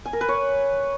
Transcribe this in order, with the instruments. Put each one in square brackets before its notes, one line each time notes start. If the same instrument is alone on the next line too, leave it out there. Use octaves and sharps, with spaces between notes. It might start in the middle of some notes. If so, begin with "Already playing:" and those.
[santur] G#5
A#4
B4
C#5